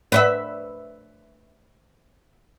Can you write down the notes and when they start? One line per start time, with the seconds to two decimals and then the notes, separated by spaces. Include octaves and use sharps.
0.12 B4 C#5 E5